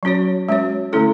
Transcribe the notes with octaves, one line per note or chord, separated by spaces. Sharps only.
F#3 C#4 F#4 C#5
G#3 C#4 F#4 C#5
D3 A3 C#4 E4 A4